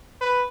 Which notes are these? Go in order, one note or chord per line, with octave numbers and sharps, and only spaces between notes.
B4